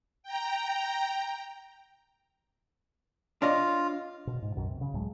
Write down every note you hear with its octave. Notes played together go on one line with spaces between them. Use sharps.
G5 A#5
D4 F4 C#5 D#5
B2
G#2
B1 F#2 B2
C3
C#3
C#2 A2 F#3 G#3